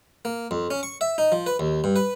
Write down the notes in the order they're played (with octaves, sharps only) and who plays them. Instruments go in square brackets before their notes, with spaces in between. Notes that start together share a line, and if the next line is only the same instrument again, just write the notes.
[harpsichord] A#3
F2
C#4
C#6
E5
D#4
F3
B4
D#2
G2
B4